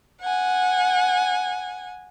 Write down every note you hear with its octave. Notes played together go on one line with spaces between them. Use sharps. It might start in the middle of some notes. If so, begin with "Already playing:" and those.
F#5 G#5